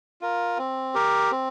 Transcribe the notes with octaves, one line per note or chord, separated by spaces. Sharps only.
F4 A#4
C4
G4 A#4
C4